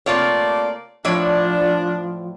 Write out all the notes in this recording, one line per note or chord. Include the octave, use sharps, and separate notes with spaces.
C3 A3 A#3 F4 C#5 D5
A2 F3 D4 C#5 D5